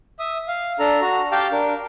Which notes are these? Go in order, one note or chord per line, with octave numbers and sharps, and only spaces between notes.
E5 D#6
F5
D4 A4 A#5
F#4 A#5
G4 F5 G5 A5
D4 A#4